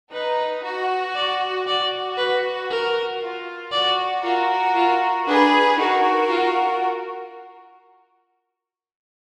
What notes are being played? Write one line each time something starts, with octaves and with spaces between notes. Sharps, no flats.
D#4 B4
F#4
D5
F#4 D5
B4
A#4
F4
F#4 D5
F4 F#4 A#4
F4
D4 G#4 B4
D#4 F#4 A#4
F4